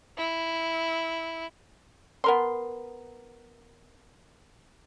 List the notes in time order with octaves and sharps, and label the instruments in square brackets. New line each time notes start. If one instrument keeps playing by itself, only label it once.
[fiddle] E4
[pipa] B3 A#4 C6